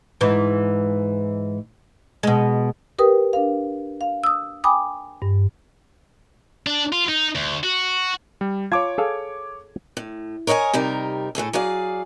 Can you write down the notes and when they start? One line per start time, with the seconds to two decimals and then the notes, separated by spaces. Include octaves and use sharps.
0.21 G#2 E3
2.23 B2 G#3
2.99 G4 A#4 B4 G5 D#6
3.33 D4 A#4 F5
4.01 F5
4.24 D#6 E6
4.64 G5 G#5 B5 D6 D#6
5.22 G2
6.67 D4
6.93 F4
7.09 D#4
7.35 D2
7.63 F#4
8.41 G3
8.72 F4 C#5 A5 D6 G#6
8.98 G#4 A4 F5
9.97 A2
10.47 A#4 C#5 D#5 F5 G#5
10.74 C3 G3 D#4 A#4
11.35 A2 A3 G#4 A4
11.53 F#3 G#4 D5 F5